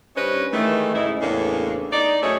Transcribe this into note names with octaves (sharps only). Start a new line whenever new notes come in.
G2 C#4 D#4 B4 C5 D#5
D#3 E3 G#3 A3
G#2 C#3 D#4 E4
E2 A2 C#3 A#3 C#4 D4
D#4 D5
F#2 A3 D#4 G#4 C#5